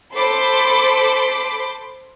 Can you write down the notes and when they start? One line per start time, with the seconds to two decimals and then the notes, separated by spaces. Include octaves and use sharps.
0.14 A4 C5 B5 C6 D6